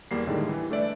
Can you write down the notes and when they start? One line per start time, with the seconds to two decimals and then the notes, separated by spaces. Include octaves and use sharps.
0.11 E2 G3 A#3 C7
0.27 A2 D3 D#3 G3 G#3
0.49 E3
0.71 A3 D4 B4 D5 E5